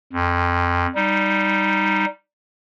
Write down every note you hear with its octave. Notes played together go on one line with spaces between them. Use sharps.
F2
G3 D#4